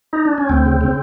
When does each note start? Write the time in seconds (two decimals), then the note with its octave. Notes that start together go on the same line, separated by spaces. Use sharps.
0.13 D#4
0.25 D4
0.38 C#4
0.49 D2 C4
0.65 C#3
0.81 C#3